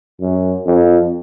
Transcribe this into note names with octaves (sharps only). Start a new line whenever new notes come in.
F#2
F2